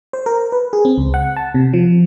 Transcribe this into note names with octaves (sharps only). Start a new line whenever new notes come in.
C5
A#4
B4
G#4
C4
C#2
F#5
A5
C3
F3